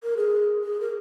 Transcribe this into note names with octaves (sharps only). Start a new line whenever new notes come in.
A#4
G#4
G#4
A#4